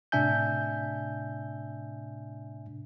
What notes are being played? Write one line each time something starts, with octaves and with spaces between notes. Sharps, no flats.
A2 C3 D4 E5 G#5 G6